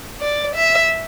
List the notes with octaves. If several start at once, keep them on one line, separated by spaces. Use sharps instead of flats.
D5
E5